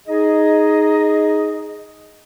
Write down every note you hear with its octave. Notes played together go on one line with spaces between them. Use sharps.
D#4 G#4 D#5